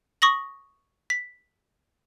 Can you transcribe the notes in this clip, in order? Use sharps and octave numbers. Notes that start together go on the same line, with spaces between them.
C#6 D#6 A#6 F#7
B6